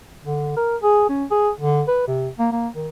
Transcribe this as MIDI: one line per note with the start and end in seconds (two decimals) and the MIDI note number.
0.25 0.55 50
0.57 0.77 70
0.82 1.09 68
1.09 1.24 61
1.31 1.50 68
1.60 1.82 50
1.88 2.04 71
2.08 2.28 48
2.39 2.48 58
2.52 2.68 58
2.76 2.88 51